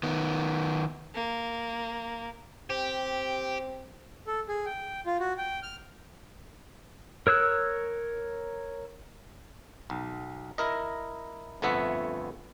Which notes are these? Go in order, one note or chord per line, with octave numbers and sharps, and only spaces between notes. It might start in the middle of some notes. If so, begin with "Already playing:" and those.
D#3 B3
A#3
C4 G4
A4
G#4
G5
F4
F#4
G5
F6
A#4 C#5 E6 F#6
B1
E4 A#4 D#5
G1 F2 A3 B3 E5 F#5